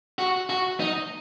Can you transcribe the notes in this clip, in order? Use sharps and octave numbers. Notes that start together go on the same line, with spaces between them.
F#4
F#4
D#4